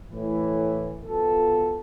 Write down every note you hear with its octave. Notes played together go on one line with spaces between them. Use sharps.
A2 E3
B1 B3 F4 A4